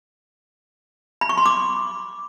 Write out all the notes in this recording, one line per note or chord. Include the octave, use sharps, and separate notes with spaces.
B5
C#6
C6
D6